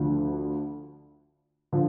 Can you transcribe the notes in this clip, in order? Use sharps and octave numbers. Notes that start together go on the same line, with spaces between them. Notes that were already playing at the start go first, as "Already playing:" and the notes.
Already playing: D2 D3 F3
D3 F3